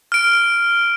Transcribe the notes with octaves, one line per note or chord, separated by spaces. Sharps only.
F6 D7